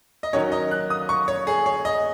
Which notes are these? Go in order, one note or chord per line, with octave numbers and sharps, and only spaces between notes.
D#5
D#3 F#3 C#4 C#5
D#5
F#6
D#6
C#6
C#5
G#4
C#5
D#5